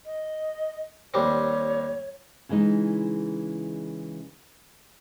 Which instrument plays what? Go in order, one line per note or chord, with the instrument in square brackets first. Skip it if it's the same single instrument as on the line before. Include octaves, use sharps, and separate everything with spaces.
[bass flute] D#5
[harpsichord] D#2 G3 C4 [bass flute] C#5
[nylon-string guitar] C#3 E3 G#3 D#4